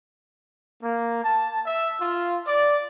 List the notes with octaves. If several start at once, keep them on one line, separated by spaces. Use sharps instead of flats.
A#3
A5
E5
F4
D5